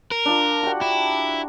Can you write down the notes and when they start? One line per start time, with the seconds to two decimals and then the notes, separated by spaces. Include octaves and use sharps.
0.11 A#4
0.26 D4 F4 A#5
0.63 F#4 G4 F#5
0.81 E4